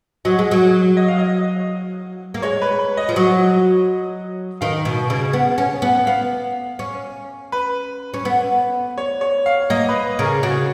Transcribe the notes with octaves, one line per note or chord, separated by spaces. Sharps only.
F#3 D#5
G#3
F#3
D#5
F5
D#5
A#3
G#3 C#5
B4
B4
D#5
F3
F#3
D#3 F5
B2
C#3
B3
C#4
B3
F#5
B3 F5
C#4
B4
C#4
B3
C#5
C#5
F5
A#3 D#5
B4
C#3 A#4
G#4
C#3 F#4